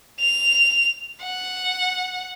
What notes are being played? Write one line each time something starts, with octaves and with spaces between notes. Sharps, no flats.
F7
F#5